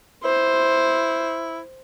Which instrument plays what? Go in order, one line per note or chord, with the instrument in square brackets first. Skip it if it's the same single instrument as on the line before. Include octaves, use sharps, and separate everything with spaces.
[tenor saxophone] E4 [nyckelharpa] C5